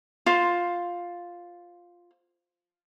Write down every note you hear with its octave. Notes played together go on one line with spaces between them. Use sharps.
F4 C5